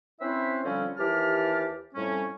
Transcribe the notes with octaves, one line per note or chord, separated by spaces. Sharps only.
C4 C#4 E4 B4 C5 E5
D3 F3 G3 C4 C#4
D#2 E3 G4 A5 F6
F2 A2 G3 C#4